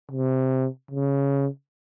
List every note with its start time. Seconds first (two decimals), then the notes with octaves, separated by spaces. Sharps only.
0.11 C3
0.91 C#3